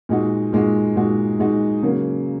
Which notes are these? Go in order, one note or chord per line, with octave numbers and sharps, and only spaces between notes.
A#2 G#3 D#4 F#4
A#2 G#3 D#4 F#4
A#2 G#3 D#4 F#4
A#2 G#3 D#4 F#4
C#3 F#3 A#3